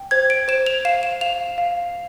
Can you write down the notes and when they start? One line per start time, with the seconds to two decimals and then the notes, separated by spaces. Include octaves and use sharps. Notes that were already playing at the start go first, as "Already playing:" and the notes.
Already playing: G5
0.11 C5 G#6
0.30 D7
0.48 C5 E7
0.66 F7
0.85 F5 E7
1.03 E7
1.21 F5 F7
1.58 F5